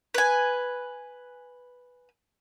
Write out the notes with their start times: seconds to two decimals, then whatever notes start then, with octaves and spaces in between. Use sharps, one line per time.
0.14 B4 G#5